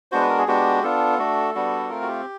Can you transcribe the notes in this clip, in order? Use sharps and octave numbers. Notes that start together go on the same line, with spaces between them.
G#3 B3 D4 F#4 C5
B4
A#4
G#4
G#3 B3 D4 F#4 G4
B3 D4 F4 A4
A3 D4 F#4
G3 B3 D4 F#4
A3 C4 F4 A#4
F#4
G4